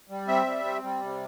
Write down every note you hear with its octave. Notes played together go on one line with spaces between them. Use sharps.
G3
C4 E5
G3
C4
G3
C3